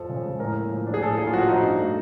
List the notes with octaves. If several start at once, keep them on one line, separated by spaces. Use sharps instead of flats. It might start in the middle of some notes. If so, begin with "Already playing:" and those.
Already playing: F2 F3 A4
C#3
G#3
A2 A#4
A#3
F3
D4
G#4
A2 A4
A#3 G#4
F4
F3 F#4
D#4
G2
A3